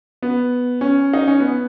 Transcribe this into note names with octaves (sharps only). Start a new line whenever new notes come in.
B3
C#4
D#4
C#4
B3